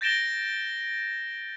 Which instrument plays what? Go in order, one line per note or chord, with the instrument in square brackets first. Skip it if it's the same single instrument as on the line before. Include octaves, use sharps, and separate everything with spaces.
[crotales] G6 A6 A#6 D7 E7 G7